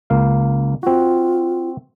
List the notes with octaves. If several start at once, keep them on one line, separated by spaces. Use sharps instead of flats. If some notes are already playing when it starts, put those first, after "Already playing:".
C#2 A#3 F5
C4 F4 F#4